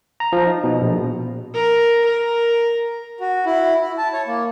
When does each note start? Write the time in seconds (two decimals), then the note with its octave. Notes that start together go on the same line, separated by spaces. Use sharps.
0.20 A#5
0.32 F3
0.47 D#4
0.64 B2
0.81 A#1
1.54 A#4
2.05 A#4
3.20 F#4
3.46 E4
3.81 E4
3.98 A5
4.13 C#5
4.27 A#3